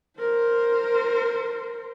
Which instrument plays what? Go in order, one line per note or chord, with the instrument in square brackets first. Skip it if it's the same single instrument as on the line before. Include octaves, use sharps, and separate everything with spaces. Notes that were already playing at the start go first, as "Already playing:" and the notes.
[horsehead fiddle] A#4 C5